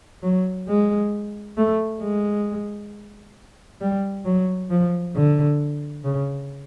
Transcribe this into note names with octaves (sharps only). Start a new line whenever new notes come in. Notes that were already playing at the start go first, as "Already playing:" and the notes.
F#3
G#3
A3
G#3
G3
F#3
F3
D3
C#3